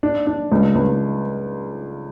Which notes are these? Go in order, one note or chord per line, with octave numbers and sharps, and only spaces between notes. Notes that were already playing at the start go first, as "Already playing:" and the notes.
D4
D4
C#2
C#2